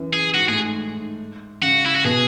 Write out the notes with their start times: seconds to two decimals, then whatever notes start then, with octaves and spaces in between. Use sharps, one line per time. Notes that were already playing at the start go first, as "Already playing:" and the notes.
Already playing: F#2 E3
0.13 G#4
0.34 G#2 F#4
0.48 A2 G#4
0.63 G#2
0.78 G#2
1.62 C#3 F#4
1.86 E4
1.96 F#4
2.05 B2 G#4